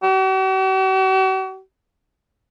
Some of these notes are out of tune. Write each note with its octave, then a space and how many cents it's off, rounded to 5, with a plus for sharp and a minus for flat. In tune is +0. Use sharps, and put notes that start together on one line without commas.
F#4 +45